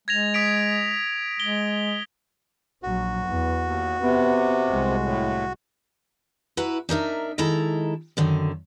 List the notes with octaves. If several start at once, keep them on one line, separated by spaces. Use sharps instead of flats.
G#3 G#6 A#6 F7
D#6 B6 D7
G#3 G7
A#1 F#3 F#4
E2
D#2
C3 B3
C2 G#3
A2
E4 F#4 B4 A#5
D4 D#4 A#4 E5
D#3 G#3 E4 A4 A#5
F#2 D3 D#3